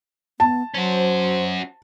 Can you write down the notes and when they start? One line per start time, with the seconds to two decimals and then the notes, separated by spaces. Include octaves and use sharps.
0.40 B3 A5
0.74 F#3 C#4 F#4 C5